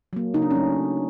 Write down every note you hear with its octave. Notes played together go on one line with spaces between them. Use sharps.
F#3 A#3
C#3 D#4
D4
C#4
F#3 A3